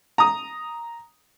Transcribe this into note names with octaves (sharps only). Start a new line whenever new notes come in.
A#5 D#6